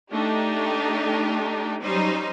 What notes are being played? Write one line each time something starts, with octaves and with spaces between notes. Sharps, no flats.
A3 D4 D#4 G4
F#3 G3 C#4 D#4 C5